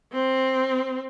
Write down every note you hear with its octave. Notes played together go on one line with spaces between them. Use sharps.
C4